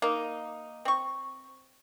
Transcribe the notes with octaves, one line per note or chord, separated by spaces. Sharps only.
A#3 D#4
C4 C#6